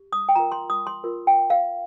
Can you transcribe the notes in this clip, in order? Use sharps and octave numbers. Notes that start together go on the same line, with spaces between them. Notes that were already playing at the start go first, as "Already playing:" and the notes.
Already playing: G4
D#6
G5
F4 A#4 A#5
C6
D#6
C6
F4 A#4
G5
F5